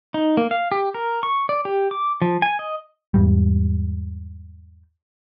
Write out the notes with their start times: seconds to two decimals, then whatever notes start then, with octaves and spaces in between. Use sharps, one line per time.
0.14 D#4
0.37 A#3
0.51 F5
0.72 G4
0.94 A#4
1.23 C#6
1.49 D5
1.65 G4
1.91 D6
2.22 F3
2.42 G#5
2.59 D#5
3.14 E2 G#2 G3